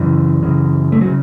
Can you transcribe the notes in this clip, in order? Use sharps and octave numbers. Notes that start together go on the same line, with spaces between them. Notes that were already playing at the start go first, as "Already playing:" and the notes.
Already playing: F#2 C#3 E3
F#2 C#3
A3
C#3 F#3